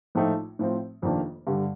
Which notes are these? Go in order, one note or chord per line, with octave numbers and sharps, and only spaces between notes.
A#1 A2 F3 A3 D#4
A2 F3 C4
F1 F2 D#3 A#3 D4
G2 D3 G3